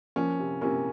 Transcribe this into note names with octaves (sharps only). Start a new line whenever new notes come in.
F3 A#3 C#4
C3
C3 A#3 C#4